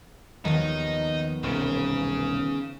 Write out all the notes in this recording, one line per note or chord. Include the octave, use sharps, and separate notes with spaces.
D#2 D#3 F3 F#3 B3 D#4
E1 C2 C#3